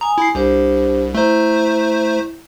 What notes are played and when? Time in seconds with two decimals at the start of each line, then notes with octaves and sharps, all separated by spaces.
0.01 G#5 A#5 D#6
0.18 E4 C7
0.35 C2 D4 G4 C5
1.14 A3 E4 C5 A#5